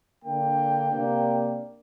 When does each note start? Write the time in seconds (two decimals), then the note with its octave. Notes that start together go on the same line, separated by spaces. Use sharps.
0.24 D3 A#3 D4 G5
0.91 C3 A#3 D4